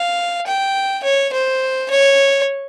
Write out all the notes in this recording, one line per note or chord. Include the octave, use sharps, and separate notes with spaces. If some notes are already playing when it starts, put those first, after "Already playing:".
Already playing: F5
G5
C#5
C5
C#5